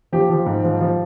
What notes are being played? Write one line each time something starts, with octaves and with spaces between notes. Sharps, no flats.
F3 G4
F3
G#2
F3
F3